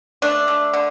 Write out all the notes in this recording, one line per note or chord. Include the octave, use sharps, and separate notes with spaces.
A3 D4
A3
D3